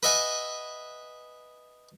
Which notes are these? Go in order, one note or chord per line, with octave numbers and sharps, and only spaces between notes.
B4 D#5 E5 F#5 G#5